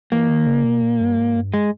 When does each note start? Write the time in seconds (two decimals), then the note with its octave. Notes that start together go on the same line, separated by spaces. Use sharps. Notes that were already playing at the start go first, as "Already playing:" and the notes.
0.11 E3 A#3
0.29 D#3
0.46 C#3
0.64 B2
0.83 A#2
1.00 G2
1.17 G#2
1.36 G2
1.54 G#3